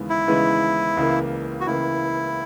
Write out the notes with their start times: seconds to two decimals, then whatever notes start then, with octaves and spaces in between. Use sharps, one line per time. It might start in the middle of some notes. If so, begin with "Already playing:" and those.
Already playing: D#2 C#3 E3 G#3 B3
0.10 E4
0.27 D#2 C#3 E3 G#3 B3
0.97 C#2 C#3 E3 A#3
1.61 F#4
1.67 C#2 C#3 E3 A#3 E4